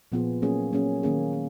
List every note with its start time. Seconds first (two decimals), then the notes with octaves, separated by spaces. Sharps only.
0.12 A#2 F3 B3 F4 G#4
0.42 F#3 A#3 C#4 G#4
0.73 F#3 A#3 C#4 G#4
1.03 D#3 A#3 C#4 G#4
1.33 G#4